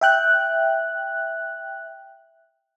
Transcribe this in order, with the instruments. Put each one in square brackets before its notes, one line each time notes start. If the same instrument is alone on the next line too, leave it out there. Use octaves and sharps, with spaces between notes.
[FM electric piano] E5 G5 F#6